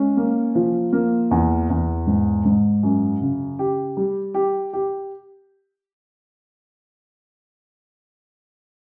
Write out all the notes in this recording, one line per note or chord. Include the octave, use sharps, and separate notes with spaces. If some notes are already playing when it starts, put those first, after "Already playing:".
Already playing: G#3 C#4
A#3
F3
A#3
E2
E2
G#2
G#2
F#2
C#3
G4
G3
G4
G4